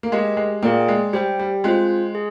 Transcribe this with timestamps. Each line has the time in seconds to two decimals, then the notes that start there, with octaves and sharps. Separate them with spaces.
0.03 A#3
0.12 G#3 G4 A#4 D#5
0.37 G#3
0.63 A#2 A#3 G#4 D5 G5
0.88 G#3
1.13 G3 G4 C5 G5
1.39 G3
1.64 G#3 C4 F4 C5
2.15 G#4